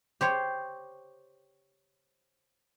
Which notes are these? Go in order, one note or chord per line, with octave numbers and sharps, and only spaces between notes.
G4 C5 C#5